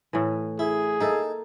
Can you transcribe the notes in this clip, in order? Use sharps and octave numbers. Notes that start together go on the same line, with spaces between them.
A2 E3
E4 G#4
A#3 D#4 A4 E5